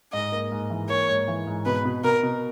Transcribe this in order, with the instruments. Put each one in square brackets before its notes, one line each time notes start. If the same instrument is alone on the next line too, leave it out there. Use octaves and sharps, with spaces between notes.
[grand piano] G#2 [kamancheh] D#5
[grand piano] A#3
G#2
E3
[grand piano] A#3 [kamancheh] C#5
[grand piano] G#2
E3
G#2
[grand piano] B2 [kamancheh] B4
[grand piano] B2
[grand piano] B2 [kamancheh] A#4
[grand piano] B2